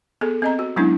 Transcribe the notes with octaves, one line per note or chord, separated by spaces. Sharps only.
B3 G#4 A4
C4 D#5 A#5
F#4
F#3 G#3 B3 C#4 D4 E4